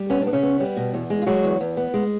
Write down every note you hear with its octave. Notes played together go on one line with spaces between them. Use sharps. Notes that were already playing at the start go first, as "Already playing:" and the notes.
Already playing: G3
B3 C#4
D4
B3
C#3 C#4
B3
G3
B2
E2
G#3
F4
F#3 G#3 F#4
E2
E2
B3
G#3